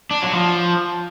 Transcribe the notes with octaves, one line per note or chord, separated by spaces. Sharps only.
D4
F#3
F3